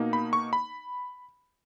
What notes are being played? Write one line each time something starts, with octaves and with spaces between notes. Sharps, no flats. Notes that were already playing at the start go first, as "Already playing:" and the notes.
Already playing: B2 A#3 D#4
B5
C#6
B5